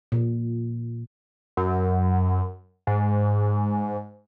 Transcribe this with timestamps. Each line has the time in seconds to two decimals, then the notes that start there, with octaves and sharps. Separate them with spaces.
0.12 A#2
1.57 F#2
2.87 G#2